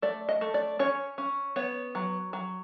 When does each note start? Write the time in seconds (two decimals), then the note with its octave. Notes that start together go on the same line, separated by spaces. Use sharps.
0.02 A3 D5
0.29 D#5
0.41 A3
0.54 D5
0.79 C#4 C#5
1.18 C#4
1.56 B3 C#5
1.95 F#3
2.33 F#3